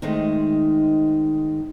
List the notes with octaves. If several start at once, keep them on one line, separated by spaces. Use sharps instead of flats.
D#3 G#3 A3 C4 D#4